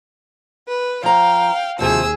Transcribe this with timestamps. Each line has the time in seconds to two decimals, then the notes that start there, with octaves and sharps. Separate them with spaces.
0.67 B4
1.03 F3 F5 G5 A#5
1.79 D#2 C3 F3 F#4 G#4 E6